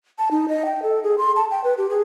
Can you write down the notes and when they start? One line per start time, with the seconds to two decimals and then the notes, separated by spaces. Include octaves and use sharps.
0.19 A5
0.31 D#4
0.49 D#5
0.65 G5
0.83 A4
1.03 G#4
1.18 C6
1.36 A5
1.51 G5
1.64 B4
1.78 G4
1.90 G#4